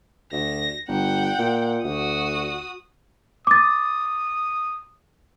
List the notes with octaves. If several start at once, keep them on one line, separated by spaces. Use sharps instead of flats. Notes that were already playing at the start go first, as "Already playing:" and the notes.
D2 A#6
G1 F#5 G5
A#2
D2 F#4 D#6
D6 D#6 A6